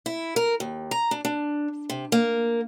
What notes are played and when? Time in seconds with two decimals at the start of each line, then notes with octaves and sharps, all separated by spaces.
0.06 E4
0.36 A#4
0.60 D#2
0.91 A#5
1.11 D4
1.25 D4
1.90 C3
2.12 A#3